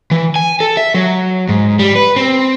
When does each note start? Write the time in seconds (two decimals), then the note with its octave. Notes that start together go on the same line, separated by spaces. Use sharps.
0.11 E3
0.36 G#5
0.60 A4
0.77 E5
0.94 F#3
1.49 G#2
1.79 G3
1.95 B4
2.16 C4